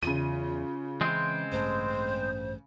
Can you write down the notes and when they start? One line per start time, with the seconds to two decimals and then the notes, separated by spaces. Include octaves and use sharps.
0.03 E2 C#3 F4 D#7
1.01 E3 G#3 C4
1.52 A1 G2 A3 C5